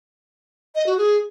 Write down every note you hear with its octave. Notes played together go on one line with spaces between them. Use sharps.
D#5
F#4
G#4